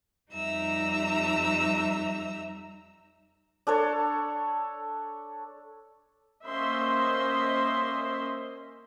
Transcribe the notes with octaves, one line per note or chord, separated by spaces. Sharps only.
F2 G3 D#4 E5 A#5 E6
D4 A4 C#5
A#3 C#4 C5 D#5 E5 C6